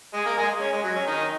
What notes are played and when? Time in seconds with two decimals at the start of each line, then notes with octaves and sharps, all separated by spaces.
0.14 G#3 G#4
0.26 A#3 A#4
0.37 G#3 G#4
0.61 C#4
0.72 G#3
0.84 F#3
0.96 C#4
1.07 D#3 D#4